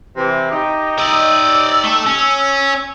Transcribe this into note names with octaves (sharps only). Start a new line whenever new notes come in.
C3 E3 A#6
D#4 G4
D5 D#5 E6
A3 A4
C#4